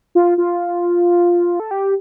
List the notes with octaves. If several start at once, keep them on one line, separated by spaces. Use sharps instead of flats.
F4
F4
A4
G4